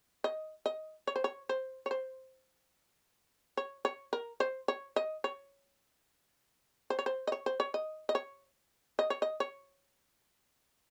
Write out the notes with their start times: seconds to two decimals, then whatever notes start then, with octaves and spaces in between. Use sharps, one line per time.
0.24 D#5
0.66 D#5
1.07 C#5
1.16 C5
1.24 C#5
1.49 C5
1.86 C#5
1.91 C5
3.57 C#5
3.85 C#5
4.13 A#4
4.40 C5
4.68 C#5
4.96 D#5
5.24 C#5
6.90 C5
6.99 C#5
7.06 C5
7.27 D#5
7.32 C#5
7.46 C5
7.60 C#5
7.74 D#5
8.09 D#5
8.15 C#5
8.99 D#5
9.10 C#5
9.22 D#5
9.40 C#5